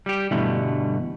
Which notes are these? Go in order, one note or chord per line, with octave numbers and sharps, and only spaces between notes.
G3 G4
G2 B2 D3 E3 G3 A3